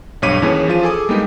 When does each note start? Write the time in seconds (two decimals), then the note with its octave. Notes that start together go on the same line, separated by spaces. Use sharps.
0.22 B1 G2 C#5 D6 B6 D#7
0.42 D#2 E3 C#4 G#4 C#5
0.68 F3 F4 D#7
0.83 G#4 A4 G#5 D6 D#6
1.09 G3 G#3 A#3 B3 D#4 G4